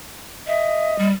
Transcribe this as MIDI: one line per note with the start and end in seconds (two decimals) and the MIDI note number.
0.47 1.08 75
0.47 0.97 76
0.99 1.12 55